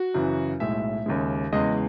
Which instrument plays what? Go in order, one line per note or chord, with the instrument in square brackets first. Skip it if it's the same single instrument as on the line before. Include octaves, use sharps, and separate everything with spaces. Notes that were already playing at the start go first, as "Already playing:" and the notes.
Already playing: [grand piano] F#4
F#2 C#3 E3
B1 A2 G#3 E5
D#2 C#3 G#3
E2 C#3 G#3 D#5